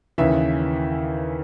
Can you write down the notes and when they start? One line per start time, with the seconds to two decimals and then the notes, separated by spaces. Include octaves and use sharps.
0.18 D#2 C#3 E3 E5